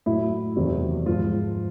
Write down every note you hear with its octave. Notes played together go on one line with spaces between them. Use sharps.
A2 F#3 E4
E2 C3 D#3 F#3
G#2 F3 F4